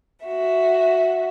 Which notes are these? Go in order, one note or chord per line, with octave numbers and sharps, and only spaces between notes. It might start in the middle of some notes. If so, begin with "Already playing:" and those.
F#4 E5